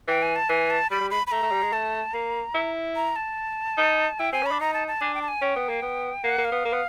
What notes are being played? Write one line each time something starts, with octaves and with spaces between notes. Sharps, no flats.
E3 G5
G#5
A5
E3 G#5
A5
G3 B5
G3
G#3 B5
B5
A3 A#5
A3
G3
G#3
A3 A5
A#3 A#5
E4
A#5
A5
D#4
E4 G5
C4 G#5
C#4 B5
D4
D#4 A#5
A5
A5
D4 G#5
G5
A5
G#5
C#4 G5
B3
A#3
B3
A#3 F#5
A#3
F5
B3
A#3
B3